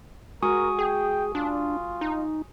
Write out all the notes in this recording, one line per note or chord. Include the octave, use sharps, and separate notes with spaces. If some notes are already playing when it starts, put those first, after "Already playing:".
G#3 F#4 A#4 G#5 C#6 D#6
G#4 G5
D4 F4
D#4